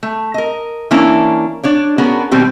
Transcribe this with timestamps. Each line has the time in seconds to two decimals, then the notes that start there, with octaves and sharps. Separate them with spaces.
0.03 A3
0.34 A#4 D#5
0.91 E3 A#3 C#4 D4 E4
1.63 D4 C#5 D5
1.98 B3 C#4 D4 F#4 G#4 A#4
2.31 B2 D#3 G3 C4 G4